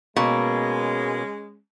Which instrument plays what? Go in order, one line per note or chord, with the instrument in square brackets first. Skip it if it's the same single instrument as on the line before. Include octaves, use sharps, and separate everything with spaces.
[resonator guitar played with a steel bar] B2 A#3 [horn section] G#3 C#4